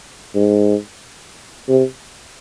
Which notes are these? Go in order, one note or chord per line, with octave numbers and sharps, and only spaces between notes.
G#2
C3